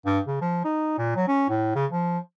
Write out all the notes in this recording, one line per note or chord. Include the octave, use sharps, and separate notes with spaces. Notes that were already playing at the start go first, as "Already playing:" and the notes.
G2
C#3
F3
D#4
A#2
F#3
C#4
A2
C#3
F3